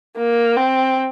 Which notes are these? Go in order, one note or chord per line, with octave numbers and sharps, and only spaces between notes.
A#3
C4